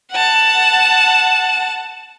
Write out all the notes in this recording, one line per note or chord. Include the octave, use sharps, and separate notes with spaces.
F#5 A5